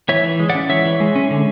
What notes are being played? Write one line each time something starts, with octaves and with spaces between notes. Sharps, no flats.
E3 C#5 E5
E3
G#3
D5 F#5
C#4
E3 C#5 E5
E3
G#3
C#4
D3